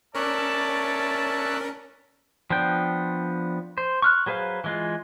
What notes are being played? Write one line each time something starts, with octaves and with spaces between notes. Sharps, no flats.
C#4 A#4 C#5 D5 E5 A5 F#6
F3 B3 D4 G5
C5
C#6 F6 F#6
F#3 G#4 B4 C5 F5
E3 G#3 F4